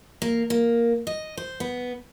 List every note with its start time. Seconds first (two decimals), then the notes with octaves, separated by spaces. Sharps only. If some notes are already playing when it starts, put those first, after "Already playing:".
0.22 A#3
0.50 A#3
1.07 D#5
1.37 C5
1.60 B3